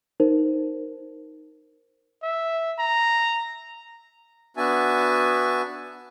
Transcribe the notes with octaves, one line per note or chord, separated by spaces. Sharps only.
D#4 A#4 C5
E5
A#5
B3 D4 F#4 E5 G#5 A5